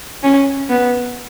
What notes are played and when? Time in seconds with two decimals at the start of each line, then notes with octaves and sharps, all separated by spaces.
0.23 C#4
0.69 B3